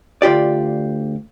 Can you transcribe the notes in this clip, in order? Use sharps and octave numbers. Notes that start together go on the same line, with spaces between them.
D2 F4 G4 D5